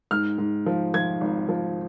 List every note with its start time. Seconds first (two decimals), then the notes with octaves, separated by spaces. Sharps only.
0.11 G#2 F6
0.38 G#2
0.66 F3
0.94 F3 G#6
1.21 G#1
1.49 F3